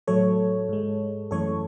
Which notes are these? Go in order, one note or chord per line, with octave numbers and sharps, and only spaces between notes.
A2 F#3 A3 A4 C#5
G#2 G#3
F#2 E3 A3 A4 C#5